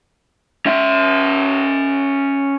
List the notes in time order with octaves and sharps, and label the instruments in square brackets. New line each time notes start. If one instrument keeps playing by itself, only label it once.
[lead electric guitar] C#4 E5